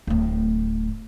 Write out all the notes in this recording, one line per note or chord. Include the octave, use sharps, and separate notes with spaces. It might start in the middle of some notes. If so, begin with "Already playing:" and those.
D1 A2